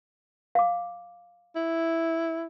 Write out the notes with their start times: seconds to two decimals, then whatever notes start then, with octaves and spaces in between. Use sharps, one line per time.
0.55 F5 D6
1.55 E4